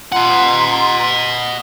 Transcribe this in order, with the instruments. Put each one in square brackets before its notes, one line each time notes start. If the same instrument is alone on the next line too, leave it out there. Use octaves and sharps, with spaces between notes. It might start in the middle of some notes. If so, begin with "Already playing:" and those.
[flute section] F4 A#5 C6 [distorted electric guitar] D#5 F#5